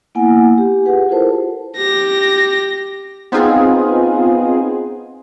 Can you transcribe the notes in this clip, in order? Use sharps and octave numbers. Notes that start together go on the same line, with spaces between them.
A#3 B3 E4 F#5 G#5
G4
F4 G4 G#4 B4 F#5
E4 F4 A4 A#4 C5 A5
G4 A#6
B3 C4 D#4 F4 G#4